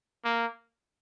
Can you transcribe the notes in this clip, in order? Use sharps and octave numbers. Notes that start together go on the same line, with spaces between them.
A#3